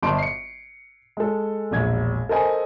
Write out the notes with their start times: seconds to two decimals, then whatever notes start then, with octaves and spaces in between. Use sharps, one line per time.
0.03 G1 D#5 A5 C6 D7
0.18 C7 C#7
1.17 G#3 A4
1.71 E1 A#1 G#6
2.29 A4 A#4 C5 D#5 G#5